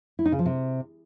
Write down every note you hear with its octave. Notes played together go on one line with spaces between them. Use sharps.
E4
D#4
C#3
F3
C3